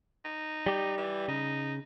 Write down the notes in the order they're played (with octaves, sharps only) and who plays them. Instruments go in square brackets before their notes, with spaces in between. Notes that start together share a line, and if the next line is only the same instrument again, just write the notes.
[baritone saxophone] D#4
[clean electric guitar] G3 G4
[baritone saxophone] E3
[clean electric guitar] C#3 [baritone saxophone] D#4